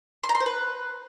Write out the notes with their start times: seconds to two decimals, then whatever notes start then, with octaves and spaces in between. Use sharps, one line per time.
0.23 C6
0.29 A#5
0.35 C6
0.40 C5
0.46 B4